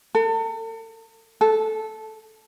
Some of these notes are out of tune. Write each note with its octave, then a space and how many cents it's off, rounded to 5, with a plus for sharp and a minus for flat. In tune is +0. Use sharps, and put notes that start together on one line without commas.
A4 +40
A4 -10